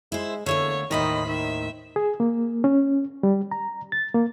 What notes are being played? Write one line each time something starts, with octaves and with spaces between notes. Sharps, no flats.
G#3 E4 C5
E2 D3 A3 A#3 C#5
D#2 A2 D#3 C5 D#5 B5
D#3 E5
G#4
A#3
C#4
G3
A#5
A6
A#3